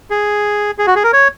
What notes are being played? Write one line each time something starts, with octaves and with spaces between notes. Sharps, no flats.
G#4
G#4
F#4
G#4
A#4
C#5